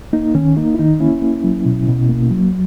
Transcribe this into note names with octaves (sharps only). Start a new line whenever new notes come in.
A#3 D#4
D#3 C#4
A#3 D#4
E4
D#3 D#4
A#3 C#4 E4
A#3
F#3
B2
B2
A#3
F#3